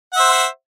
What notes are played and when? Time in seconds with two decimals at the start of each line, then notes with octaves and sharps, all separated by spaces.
0.13 F#5
0.16 E5
0.20 C5